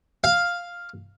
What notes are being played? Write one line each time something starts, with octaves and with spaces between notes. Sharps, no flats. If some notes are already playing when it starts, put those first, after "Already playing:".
F5